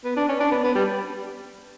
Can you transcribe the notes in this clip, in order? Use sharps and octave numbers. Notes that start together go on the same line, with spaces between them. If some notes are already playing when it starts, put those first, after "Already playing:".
B3
D4
C#4
D4
B3
B3
G3